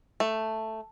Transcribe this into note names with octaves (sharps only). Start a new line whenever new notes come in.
A3